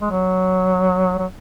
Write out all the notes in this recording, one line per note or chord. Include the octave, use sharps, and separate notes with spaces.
G#3
F#3
F#3